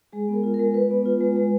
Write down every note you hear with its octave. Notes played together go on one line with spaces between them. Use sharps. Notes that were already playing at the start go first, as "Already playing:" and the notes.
G#3 G#4
B3 A#4
F4
A#4
G#3
G#3 B4
B3
F4
G#3
G#3